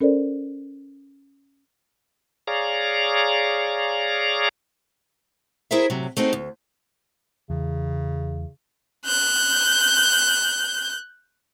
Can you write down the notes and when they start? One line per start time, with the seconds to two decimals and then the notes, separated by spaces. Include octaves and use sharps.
0.01 C#4 A4 A#4 C5 D5
2.47 G#4 C#5 D5 F5 A#5
5.71 E4 G#4 A#4 C5 E5
5.90 A2 C3 F#3
6.17 A3 C4 D#4 F#4 G#4
6.33 D2
7.50 E2 C#3
9.06 F#6 G6